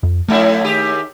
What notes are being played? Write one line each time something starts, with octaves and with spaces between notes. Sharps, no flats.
F2
F2 A2 A3 E4
D#2 G4 G#4